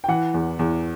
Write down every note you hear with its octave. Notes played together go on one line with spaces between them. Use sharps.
G5
E3 F#5
E2
E2